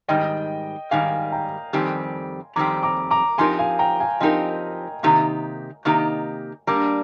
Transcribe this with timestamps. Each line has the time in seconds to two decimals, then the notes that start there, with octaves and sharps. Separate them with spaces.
0.08 G#2 D#3 G3 D#5 G5
0.91 G#2 D#3 G3 F5 G#5
1.32 G5 A#5
1.73 F2 D#3 G3 C4 G4 G#5 C6
2.56 F2 D#3 G3 C4 G4 A#5 D6
2.83 A#5 D6
3.11 A#5 D6
3.38 F3 C4 D#4 G4 A#4 G#5 C6
3.59 F5 G#5
3.79 G5 A#5
4.00 F5 G#5
4.20 F3 C4 D#4 G4 A#4 D#5 G5
5.03 C3 D#3 A#3 D#4 G4
5.85 C3 D#3 A#3 D#4 G4
6.67 G3 A#3 D4 A#5 D6